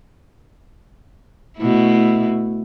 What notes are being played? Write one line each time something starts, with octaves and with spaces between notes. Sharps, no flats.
B2 A3 E4